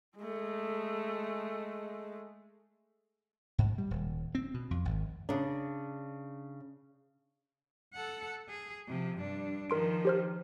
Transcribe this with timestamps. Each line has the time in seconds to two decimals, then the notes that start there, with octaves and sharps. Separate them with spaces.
0.18 G#3 A3
3.58 G#2
3.78 G3
3.91 D#1
4.35 C4
4.54 B2
4.71 F2
4.85 G#1
5.29 C#3 D4
7.94 A4 F#5
8.49 G#4
8.88 C3 F3
9.17 G2 D4
9.70 D#3 F3 A#4 C6 D7
10.05 G4 C5 F6